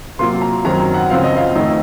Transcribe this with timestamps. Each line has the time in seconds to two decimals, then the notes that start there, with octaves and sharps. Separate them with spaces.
0.19 C3 F#3 A#3 F4 C6
0.42 A#5
0.65 F#2 D#3 F#3 C4 A#5
0.94 F#5
1.10 C#2 C#3 F3 C4 F4 F5
1.24 D#5
1.36 F5
1.55 F2 D#3 A3 D#4